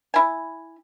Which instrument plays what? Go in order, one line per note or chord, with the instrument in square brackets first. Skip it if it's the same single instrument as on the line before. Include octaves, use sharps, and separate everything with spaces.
[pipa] E4 G#5